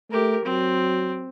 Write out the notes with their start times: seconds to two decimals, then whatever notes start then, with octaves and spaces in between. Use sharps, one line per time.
0.11 A3 G4 A#4
0.45 F#3 C4